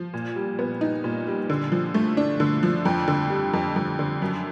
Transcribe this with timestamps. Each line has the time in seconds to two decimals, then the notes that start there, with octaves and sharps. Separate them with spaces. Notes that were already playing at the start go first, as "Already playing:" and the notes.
Already playing: F3
0.14 A#2
0.36 G3
0.59 B3
0.81 D#4
1.04 A#2
1.27 G3
1.50 D3
1.72 F3
1.94 A3
2.17 D4
2.40 D3
2.63 F3
2.85 F2
3.08 D3
3.30 G3
3.53 F2
3.76 F2
3.99 D3
4.22 F#2